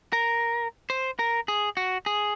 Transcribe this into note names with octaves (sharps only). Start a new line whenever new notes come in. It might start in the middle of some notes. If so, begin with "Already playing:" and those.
A#4
C5
A#4
G#4
F#4
G#4